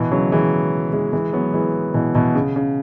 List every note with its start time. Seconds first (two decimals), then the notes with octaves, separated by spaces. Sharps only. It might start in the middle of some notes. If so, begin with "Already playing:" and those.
Already playing: B2 E3
0.11 C#3 F#3
0.32 E3 G#3
0.93 E3 G#3
1.13 E3 G#3
1.33 F#3 B3
1.54 E3 G#3
1.94 B2 E3
2.15 B2 E3
2.35 C#3
2.56 C#3